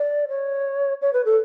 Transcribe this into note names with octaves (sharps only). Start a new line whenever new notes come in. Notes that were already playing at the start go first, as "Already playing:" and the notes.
Already playing: D5
C#5
C#5
B4
A4